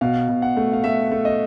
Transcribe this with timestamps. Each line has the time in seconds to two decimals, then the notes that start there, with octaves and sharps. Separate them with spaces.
0.01 B2 F5
0.28 B2
0.42 F#5
0.57 A3
0.73 F5
0.84 A3 E5
1.12 A3
1.25 D#5